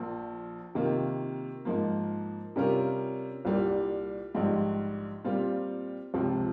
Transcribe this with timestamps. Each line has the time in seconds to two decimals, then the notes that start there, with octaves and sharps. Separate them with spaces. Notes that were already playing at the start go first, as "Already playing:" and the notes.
Already playing: A#1 A#2 F3
0.75 C3 D#3 A#3 F4
1.65 G#2 F3 A#3
2.56 C3 G3 C#4 F4 A#4
3.45 C2 A#2 G3
4.35 A#1 G#2 G3
5.24 A#2 G3 C4 F4
6.14 C#2 C3 F3 C4